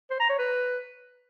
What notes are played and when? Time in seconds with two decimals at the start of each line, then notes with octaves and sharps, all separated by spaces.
0.10 C5
0.20 A#5
0.29 C#5
0.38 B4